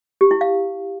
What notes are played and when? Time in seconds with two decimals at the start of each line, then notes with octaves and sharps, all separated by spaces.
0.21 G4
0.31 E4
0.41 F5